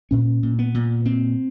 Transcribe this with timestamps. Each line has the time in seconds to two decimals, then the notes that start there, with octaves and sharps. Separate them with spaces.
0.11 A#2 C#4
0.43 A#2
0.59 B3
0.74 A#2
1.05 A#2 C4